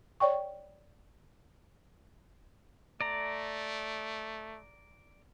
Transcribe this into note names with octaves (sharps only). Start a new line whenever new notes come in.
C#5 D5 G5 C#6
A3 D5 A#5